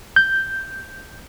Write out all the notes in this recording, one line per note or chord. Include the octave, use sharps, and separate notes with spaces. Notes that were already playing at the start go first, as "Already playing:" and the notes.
G6